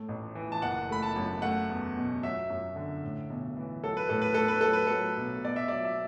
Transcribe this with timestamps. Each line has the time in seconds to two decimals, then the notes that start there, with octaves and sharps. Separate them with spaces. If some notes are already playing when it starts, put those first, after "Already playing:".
Already playing: A2 A3
0.09 A1
0.35 E3
0.52 A5
0.62 F#1 F#5
0.89 A3 B5
1.02 A5
1.16 F#2
1.42 A3 F#5
1.69 E2
1.97 B2
2.23 F#3 E5
2.50 F#2
2.76 D3
3.03 A2
3.30 B1
3.57 E3
3.83 F#3 A4
3.97 B4
4.09 A2 A4
4.22 B4
4.34 A3 A4
4.48 B4
4.61 F#3 A4
4.73 B4
4.87 F#3 A4
5.17 B1
5.44 B2 D5
5.56 E5
5.68 F#3 D5
5.85 E5